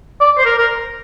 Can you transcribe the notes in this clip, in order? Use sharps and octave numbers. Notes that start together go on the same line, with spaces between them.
D5
C5
A#4
A#4